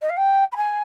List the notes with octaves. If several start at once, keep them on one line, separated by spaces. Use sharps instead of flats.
D#5
F5
G5
B5
G#5